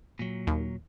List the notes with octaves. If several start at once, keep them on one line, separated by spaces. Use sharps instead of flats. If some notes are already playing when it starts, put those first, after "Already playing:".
A#2 F#3
D#2